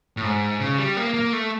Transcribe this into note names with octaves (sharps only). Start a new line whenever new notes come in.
A2
G#2
C#3
G3
A#3
A#3
A3